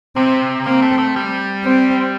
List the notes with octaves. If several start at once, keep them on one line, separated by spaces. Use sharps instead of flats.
C3 C4
A#3 C4
A3
A3
G3
C4